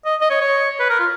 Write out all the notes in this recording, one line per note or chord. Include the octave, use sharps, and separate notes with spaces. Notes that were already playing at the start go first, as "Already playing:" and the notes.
D#5
D#5
C#5
C#5
B4
A#4
F4